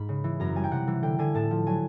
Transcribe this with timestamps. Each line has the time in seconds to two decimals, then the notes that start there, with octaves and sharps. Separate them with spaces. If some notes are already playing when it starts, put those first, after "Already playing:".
Already playing: G#2 B5
0.09 C#3
0.24 E3
0.40 F#2 A#5
0.56 G3 G#5
0.64 G5
0.71 C3 F#5
0.87 E3
1.02 D3 G5
1.19 D3 G#5
1.34 A2 A5
1.51 F3
1.67 F#3 G#5